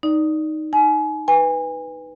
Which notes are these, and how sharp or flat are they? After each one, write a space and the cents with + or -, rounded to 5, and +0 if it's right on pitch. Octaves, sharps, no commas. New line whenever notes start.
D#4 +0 D5 +0
D#4 +0 G#5 +30
B4 +0 G#5 -30